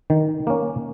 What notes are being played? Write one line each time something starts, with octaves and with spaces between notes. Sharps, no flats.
D#3
A#3 C#4